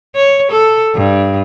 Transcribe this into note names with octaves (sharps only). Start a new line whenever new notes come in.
C#5
A4
G2